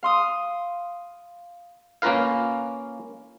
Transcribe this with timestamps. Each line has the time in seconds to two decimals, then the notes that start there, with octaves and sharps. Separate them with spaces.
0.03 F5 C6 D#6
2.02 A#3 C#4 F4 A#4 B4 F5